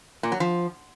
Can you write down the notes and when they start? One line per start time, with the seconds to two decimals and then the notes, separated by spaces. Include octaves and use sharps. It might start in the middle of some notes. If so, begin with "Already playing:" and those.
0.23 A#2
0.32 F#3
0.40 F3